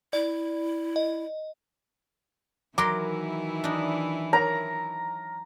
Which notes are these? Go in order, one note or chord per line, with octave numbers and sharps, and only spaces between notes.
E4 D5
D#5
D#3 E3 F#3 E4 A#4 A#5 C6 D6
D4 D#4
A#4 C#5 A#5